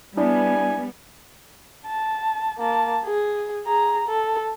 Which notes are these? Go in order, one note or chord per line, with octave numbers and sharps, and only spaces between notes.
G3 B3 D4 E4 D5 G#5
A5
A#3 A5
G#4
G#4 A#5
A4